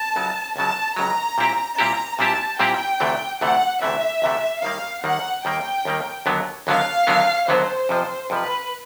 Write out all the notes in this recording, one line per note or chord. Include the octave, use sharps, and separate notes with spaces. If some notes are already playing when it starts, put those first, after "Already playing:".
Already playing: A5
C#2 C#3 F#3
C#2 C#3 F#3 A5
C#2 C#3 F#3 A#5
A#2 G3 C4 E4 G4
A#2 G3 C4 E4 G4 A#5
A#2 G3 C4 E4 G4 A5
A#2 G3 C4 E4 G4 G5
D2 C3 E3 A3
D2 C3 E3 A3 F#5
D2 C3 E3 A3 E5
D2 C3 E3 A3
D#2 D#3 G3 A#3 F5
D#2 D#3 G3 A#3 F#5
D#2 D#3 G3 A#3 G5
D#2 D#3 G3 A#3
D#2 D3 F#3 B3
D#2 D3 F#3 B3 F5
D#2 D3 F#3 B3
D#2 D3 F#3 B3 C5
F2 C3 F3
F2 C3 F3 B4